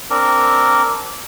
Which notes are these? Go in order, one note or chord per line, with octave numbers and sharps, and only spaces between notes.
C4 D4 A#4